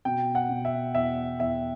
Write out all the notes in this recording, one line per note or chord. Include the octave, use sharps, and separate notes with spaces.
B2 G5
F#5
B2
E5
E2 E5
E2 E5